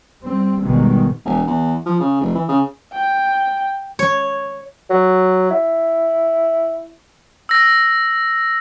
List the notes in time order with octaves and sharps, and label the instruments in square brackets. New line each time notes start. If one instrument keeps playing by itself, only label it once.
[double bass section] G3 C4
G#1 B2 D#3 G3 G#3
[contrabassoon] E1
E2
F3
C#3
F1
E3
C#3
[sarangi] G5
[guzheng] C#5
[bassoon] F#3
E4
[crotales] E6 A#6